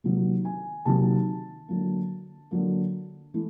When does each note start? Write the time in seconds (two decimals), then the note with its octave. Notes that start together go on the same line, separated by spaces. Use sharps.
0.04 C3 D#3 F#3 A#3
0.45 G#5
0.85 C3 D#3 F#3 A#3 A5
1.68 D3 F#3 A#3
2.51 D3 F#3 A#3
3.34 E3 A3